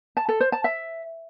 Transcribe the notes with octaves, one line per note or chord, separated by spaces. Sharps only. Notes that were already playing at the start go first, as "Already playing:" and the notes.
A5
A4
C5
A5
E5